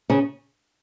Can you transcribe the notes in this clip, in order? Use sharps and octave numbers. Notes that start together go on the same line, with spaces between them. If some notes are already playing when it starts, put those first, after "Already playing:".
C#3 C#4